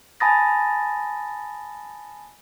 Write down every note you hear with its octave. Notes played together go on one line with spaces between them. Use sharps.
G#5 A5 B5 D#6 A6 A#6